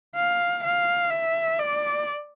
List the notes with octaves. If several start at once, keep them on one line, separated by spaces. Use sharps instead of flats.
F5
F5
E5
D5